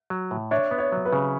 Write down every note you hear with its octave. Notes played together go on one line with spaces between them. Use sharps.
F#3
A2
D4 C#5 E5
B3
C#5
F#3
B4
C#3